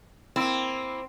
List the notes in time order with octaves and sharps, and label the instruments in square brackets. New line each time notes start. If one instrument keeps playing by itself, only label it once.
[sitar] A#3 E4 [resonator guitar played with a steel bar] C4